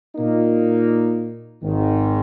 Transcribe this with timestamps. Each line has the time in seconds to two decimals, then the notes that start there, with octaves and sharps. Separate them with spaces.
0.16 A#2 A#3 D#4
1.62 G#1 G#2 D#3